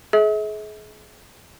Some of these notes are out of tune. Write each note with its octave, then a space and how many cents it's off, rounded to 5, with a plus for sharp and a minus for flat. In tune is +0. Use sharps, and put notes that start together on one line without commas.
G#4 +35 E5 -45